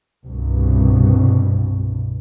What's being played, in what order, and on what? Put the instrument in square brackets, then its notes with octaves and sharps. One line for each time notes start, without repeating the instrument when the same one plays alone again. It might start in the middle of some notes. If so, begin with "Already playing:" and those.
[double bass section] C2 G2 B2